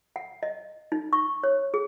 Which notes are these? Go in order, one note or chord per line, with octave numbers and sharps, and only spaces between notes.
F#5
D#5
D#4
C#6
C#5
G#4